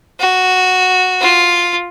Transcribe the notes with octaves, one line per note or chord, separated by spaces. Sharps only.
F#4
F4